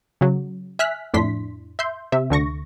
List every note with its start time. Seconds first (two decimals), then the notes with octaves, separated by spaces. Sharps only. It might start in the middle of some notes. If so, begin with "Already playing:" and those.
0.21 C#3 F#3
0.79 E5 G#5 F6 F#6 B6
1.14 F2 A2 D4 E4 C6 B6
1.79 E5 C6 G6
2.12 C3 E5
2.30 D2 D3 C#6 A#6